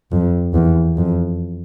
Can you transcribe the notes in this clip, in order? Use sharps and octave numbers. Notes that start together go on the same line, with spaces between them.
F2
E2
F2